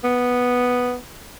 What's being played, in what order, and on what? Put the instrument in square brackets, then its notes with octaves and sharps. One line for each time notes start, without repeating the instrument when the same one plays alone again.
[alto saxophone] B3